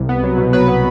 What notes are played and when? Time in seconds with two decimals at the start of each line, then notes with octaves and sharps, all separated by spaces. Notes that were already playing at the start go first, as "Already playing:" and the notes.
Already playing: C2
0.09 B3
0.23 F#3
0.38 B2
0.53 F#3 B4
0.68 B3